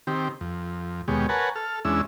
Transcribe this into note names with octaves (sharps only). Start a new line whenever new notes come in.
D#3 C4 G4
F2
D#2 B2 G#3 G4 C#5
A#4 B4 C#5 F#5 G#5 A5
A4 F6
E2 G#3 C#4 D4 E4 E6